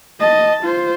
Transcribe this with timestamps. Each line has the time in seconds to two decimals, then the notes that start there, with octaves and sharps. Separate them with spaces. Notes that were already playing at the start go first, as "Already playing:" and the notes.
0.20 D#5 A5
0.64 F4 C5